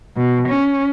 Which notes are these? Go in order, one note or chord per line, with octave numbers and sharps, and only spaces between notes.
B2
C#4